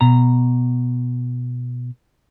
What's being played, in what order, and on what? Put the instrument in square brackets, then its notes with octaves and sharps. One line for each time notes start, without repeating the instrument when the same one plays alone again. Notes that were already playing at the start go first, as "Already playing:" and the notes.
[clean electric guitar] B2 A#5